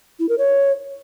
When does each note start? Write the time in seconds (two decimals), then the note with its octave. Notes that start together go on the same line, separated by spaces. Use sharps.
0.20 E4
0.29 A#4
0.38 C#5